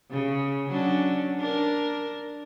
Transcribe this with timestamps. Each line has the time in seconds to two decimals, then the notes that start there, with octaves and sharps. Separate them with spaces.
0.11 C#3
0.69 F#3 C#4 D4
1.39 D4 A#4